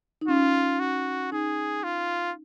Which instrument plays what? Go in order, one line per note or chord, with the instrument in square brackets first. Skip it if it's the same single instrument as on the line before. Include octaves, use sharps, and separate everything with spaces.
[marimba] D#4
[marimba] C#4 [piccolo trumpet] F4
[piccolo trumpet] F#4
[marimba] D#4 [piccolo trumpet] G#4
[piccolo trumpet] F4